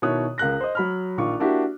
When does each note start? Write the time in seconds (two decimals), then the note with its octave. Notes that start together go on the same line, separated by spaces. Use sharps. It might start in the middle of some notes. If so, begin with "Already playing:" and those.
0.02 B2 D#3 E4 C#5 D#6 F#6
0.38 C#2 A#4 F#6 A#6
0.61 C5 D#5
0.75 F#3 B5 F6
1.17 A#1 D#3 F4 C#6 D6
1.40 A#3 D4 E4 F#4 G4